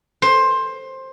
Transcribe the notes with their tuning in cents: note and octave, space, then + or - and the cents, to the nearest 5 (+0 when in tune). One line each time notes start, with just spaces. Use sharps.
C5 +15